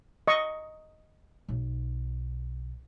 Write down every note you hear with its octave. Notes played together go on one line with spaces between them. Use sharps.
D#5 C#6
B1